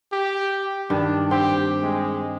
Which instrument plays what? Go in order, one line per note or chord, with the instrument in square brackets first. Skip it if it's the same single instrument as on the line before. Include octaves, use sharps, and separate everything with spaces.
[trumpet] G4
[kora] G2 D#3 [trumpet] D4
[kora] C4 [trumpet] G4
[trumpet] G#3